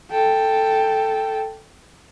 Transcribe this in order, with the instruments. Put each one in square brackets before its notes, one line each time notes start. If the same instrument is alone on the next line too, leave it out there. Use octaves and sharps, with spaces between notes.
[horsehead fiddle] A4 G5